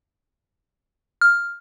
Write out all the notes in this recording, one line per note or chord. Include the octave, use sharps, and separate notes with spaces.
F6